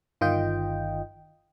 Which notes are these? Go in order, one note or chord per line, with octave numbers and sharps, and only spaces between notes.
G1 D#3 F4 D#5 G5